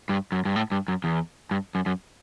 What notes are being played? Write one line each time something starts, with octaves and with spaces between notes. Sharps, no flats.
G2
F#2
G2
A2
G2
F#2
E2
G2
F#2
F#2